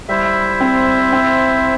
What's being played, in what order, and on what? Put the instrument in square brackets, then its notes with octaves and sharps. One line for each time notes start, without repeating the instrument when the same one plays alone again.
[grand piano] G3 [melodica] E4 C5 E5
[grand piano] C4
C4